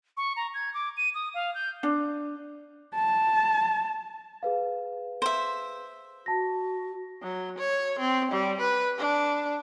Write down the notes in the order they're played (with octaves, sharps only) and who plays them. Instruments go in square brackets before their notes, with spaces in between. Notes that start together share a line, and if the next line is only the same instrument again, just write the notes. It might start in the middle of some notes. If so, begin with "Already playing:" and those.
[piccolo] C#6
A#5
G#6
D6
D#7
D#6
F5
G6
[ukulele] D4
[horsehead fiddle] A5
[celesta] G#4 B4 F5
[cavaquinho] C5 E5
[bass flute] F#4 [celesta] A5 A#6
[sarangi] F#3
C#5
C4
G3
B4
D4